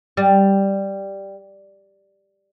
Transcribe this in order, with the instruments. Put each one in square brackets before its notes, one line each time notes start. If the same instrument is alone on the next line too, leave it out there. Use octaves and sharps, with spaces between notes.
[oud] G3